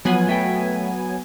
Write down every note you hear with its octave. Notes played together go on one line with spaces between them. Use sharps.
F3 F#3 B3 F4 F#5 G#5
A3 E5 G5